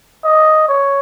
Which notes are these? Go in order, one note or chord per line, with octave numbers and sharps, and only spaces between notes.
D#5
C#5